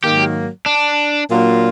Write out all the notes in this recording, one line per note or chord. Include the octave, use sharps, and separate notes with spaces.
G#2 D#3 F#3 A#3 G4
D4
A#2 F#3 A#3 D4 F4